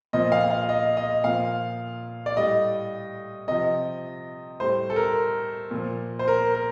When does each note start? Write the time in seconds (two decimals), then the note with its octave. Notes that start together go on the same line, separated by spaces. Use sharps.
0.13 A#2 F3 D#5
0.32 F5
0.50 F5
0.69 D#5
0.97 D#5
1.24 A#2 F3 F5
2.26 D5
2.36 A2 G3 D#5
3.48 C3 F3 D#5
4.60 A2 G3 C5
4.90 A4
4.96 A#4
5.71 A#2 F3
6.19 C5
6.28 A#4
6.55 A#4